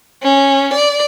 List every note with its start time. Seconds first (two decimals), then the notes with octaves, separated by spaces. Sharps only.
0.23 C#4
0.73 D5